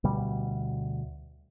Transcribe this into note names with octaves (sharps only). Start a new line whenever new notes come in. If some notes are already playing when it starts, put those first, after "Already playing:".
D2 B2 G3